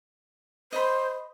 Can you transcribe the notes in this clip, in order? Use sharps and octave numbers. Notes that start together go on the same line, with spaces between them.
C5 D#5 B5